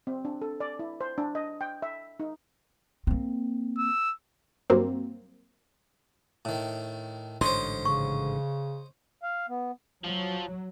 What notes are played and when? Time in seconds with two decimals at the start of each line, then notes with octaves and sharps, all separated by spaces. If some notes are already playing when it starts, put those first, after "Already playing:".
0.07 C4
0.25 D4
0.42 A4
0.60 D5
0.79 E4
1.01 C5
1.18 D4
1.35 D#5
1.61 G5
1.82 E5
2.20 D#4
3.07 A#3 C4
3.78 E6
4.70 G2 F#3 A#3 C4
6.45 A2 D#3
7.41 A1 G#2 D3 C5 C#5 D#5 C6
7.85 C#3 C#6
9.23 F5
9.49 B3
10.04 F3 F#3